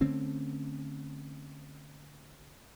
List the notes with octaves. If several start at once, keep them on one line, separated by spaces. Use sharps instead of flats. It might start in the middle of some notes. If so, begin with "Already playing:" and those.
D3 A3 C4 C#4